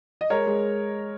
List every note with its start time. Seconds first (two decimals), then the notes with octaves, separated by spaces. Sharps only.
0.21 D#5
0.30 G#3 A#4 C#5
0.47 G#3